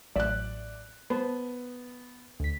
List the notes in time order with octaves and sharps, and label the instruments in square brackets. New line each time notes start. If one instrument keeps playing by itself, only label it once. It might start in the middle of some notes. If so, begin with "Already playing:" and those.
[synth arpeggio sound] A1 F#3 E5 [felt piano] D5 F#6
[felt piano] B3 [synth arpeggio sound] C5 A5
[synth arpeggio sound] D2 B6